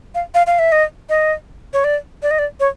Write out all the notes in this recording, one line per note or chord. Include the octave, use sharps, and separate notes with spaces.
F5
F5
F5
E5
D#5
D#5
C#5
D5
D5
D#5
D5
C#5